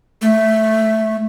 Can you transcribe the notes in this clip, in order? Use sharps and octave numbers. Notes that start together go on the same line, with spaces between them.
A3